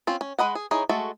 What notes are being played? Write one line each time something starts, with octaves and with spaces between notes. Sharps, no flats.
C4 C#4 F4
C#4
G#3 B4 D#5 F#5
G#4
E3 D#4 G#4 C#5
G#3 A3 F#4 A4